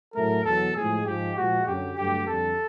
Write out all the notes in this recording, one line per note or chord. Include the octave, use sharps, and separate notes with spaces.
A2 F#3 A3 A#4
E2 B2 F#3 A4
A2 F3 G#3 G#4
G#2 F3 G#3 G4
A#2 F3 G#3 F#4
F#2 D3 F#3 G4
G2 D3 F#3 A3 G4
F2 D3 G3 A4